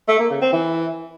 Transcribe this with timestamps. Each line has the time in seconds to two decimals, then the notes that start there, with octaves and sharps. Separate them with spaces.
0.08 A3
0.19 A#3
0.30 C#3
0.42 C4
0.53 E3